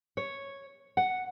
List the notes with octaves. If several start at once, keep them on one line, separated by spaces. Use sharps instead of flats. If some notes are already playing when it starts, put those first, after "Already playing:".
C#5
F#5